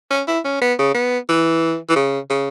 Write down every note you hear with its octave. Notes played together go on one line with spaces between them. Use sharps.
C#4
E4
C#4
B3
C#3
B3
E3
E3
C#3
C#3